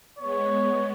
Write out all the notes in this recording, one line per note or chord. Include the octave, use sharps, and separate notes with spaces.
G#3 B3 C#5